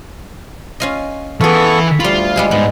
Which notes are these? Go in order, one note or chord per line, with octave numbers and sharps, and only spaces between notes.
C#4 F4 D#5
E3 B3 F4 G#4 A4 B4 C#6
D2 G3 F4 B5
G3 G#3 G#4
G#2 B3